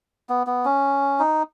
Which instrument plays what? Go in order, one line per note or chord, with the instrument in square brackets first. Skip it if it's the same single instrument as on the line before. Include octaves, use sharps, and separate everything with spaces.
[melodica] B3
B3
C#4
D#4